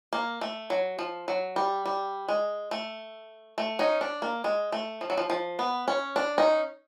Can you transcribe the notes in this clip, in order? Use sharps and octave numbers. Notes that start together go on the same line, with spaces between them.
A#3
A3
F#3
F3
F#3
G3
G3
G#3
A3
A3
C#4 D#4
D4
A#3
G#3
A3
F3
F#3
F3
F3
B3
C#4
D4
C#4 D#4